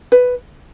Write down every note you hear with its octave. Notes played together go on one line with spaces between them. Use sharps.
B4